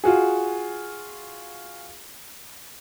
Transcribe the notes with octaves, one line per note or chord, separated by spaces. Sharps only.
F4 F#4 G#4